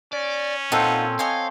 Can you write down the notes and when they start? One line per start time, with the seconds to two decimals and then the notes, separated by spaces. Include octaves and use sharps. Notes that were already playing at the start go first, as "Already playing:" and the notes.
0.13 C#4 D5
0.72 A#2 C4 D#4 F4 A4 C5 F#5
1.19 C#5 D#5 F5 G#5